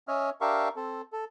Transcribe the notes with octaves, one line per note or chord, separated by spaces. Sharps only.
C#4 C#5 D#5 E5 F6
D4 G4 A#4 E5 F5 C#6
C4 A4
A4